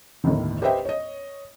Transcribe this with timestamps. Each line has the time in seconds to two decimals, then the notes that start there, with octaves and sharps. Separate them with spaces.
0.24 G1 D#2 A2 D#3
0.62 G4 B4 C5 D#5 E5 G5
0.85 C#5 D#5